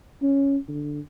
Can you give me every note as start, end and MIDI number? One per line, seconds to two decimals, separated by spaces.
0.22 0.57 61
0.68 1.00 50